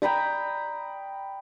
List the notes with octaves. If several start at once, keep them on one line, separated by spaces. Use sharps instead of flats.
G5 A#5 B5 D#6